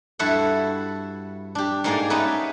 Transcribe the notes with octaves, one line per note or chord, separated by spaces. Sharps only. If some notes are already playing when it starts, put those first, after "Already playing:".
G2 E4 F#4 A4 E5 F#5
D4 G4
G#2 G#3 A#3 D#4 G#4 D5
B3 C#4 D#4 G4 B4 E5